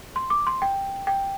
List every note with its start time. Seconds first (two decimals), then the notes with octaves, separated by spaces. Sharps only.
0.16 C6
0.30 D6
0.47 C6
0.62 G5
1.07 G5